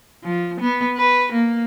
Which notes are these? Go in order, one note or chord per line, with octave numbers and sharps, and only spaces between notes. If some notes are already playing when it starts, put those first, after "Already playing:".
F3
B3
B4
A#3